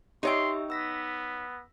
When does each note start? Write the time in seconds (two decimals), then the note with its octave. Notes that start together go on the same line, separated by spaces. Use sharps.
0.23 D#4 G4 C#5 E5 G5 C6 E6
0.70 B3 E6 A#6 B6